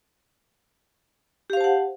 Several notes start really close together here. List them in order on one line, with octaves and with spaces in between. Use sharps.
G4 F5 C5 A5 F#5